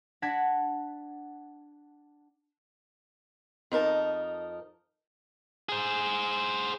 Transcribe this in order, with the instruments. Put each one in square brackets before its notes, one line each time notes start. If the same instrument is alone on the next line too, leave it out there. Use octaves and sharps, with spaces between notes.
[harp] D4 F#5 A5 G#6 A#6 B6
[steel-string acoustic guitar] F2 D#4 A#4 A5
[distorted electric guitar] G#4 C5